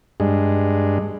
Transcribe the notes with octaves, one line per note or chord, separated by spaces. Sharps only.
G2 G#3